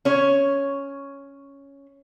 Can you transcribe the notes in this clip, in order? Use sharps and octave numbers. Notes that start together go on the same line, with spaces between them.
C#4 C#5